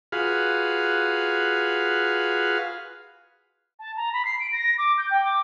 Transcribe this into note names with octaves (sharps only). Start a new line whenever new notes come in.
F4 F#4 G#4 B4 F5
A5
A#5
B5
C7
D7
A#6
D6
G6
G5
D6